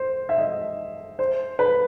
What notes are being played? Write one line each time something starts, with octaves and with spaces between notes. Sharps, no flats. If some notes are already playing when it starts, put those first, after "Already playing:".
Already playing: C5
E5
D#5
C5
B4